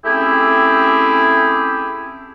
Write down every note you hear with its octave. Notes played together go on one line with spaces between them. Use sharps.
A3 C4 C#4 E4 G4 G#4